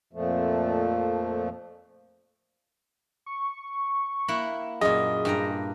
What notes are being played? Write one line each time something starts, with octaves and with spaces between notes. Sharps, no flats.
F2 A#2 F3 A3
C#6
A#3 E4 F#5
F#2 A#2 G#4 D#5
G2 G5 A#5